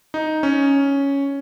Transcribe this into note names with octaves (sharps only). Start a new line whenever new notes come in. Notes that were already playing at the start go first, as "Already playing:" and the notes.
D#4
C#4